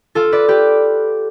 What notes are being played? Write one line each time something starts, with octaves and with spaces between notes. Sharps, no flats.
F4 A4
B4 D5
G4 B4